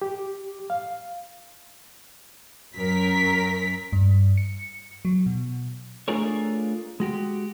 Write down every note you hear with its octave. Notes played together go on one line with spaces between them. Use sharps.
G4
F5
F#2 A#4 B6
G2
C#7
F#3
B2
A3 D4 F4 G#4 A#4 C#5
G#3 F#4 G4